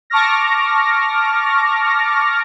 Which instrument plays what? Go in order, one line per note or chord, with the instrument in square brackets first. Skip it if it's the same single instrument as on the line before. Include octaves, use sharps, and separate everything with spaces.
[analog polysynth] A5 C#6 D6 F6 A#6